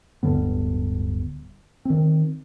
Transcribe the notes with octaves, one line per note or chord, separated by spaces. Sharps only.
D1 G2 D3 B3
D#3 C4